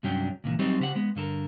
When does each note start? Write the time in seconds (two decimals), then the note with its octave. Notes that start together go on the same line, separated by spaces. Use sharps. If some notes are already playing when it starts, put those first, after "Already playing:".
0.03 C2 G2 F#3 C#4 D4 G5
0.44 C#2 A#2 D3 E3
0.59 F#3 G3 C4 D#4 G4 C5
0.80 C#3 G4 C5 F#5
0.95 G#3 B3
1.16 G2 D3 A4 A#4